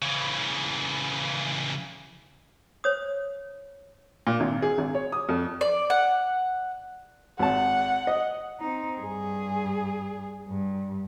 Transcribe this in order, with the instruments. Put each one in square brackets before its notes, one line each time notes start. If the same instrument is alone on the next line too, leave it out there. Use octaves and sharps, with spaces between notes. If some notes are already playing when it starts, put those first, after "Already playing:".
[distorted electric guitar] C#3 E3
[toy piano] C5 C#5 D#6
[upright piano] A#2
G#1
G#4
G#1
C#5
D#6
F2
[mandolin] D5
F#5
[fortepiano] G#1 A5 [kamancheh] F#5
[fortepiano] D#5
[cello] C4 D#4
G2 G#4
G2